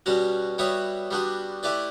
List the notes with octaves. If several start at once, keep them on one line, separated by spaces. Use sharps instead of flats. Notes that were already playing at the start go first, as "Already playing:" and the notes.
B2 G3 C#4 F#4
G3 B3 F#4 C#5 E5
G3 B3 D4 F#4
A3 E4 G4 B4 D5